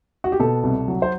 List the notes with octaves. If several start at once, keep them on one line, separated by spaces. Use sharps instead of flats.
F#4
G4
B2 A4
C2
F#3
C5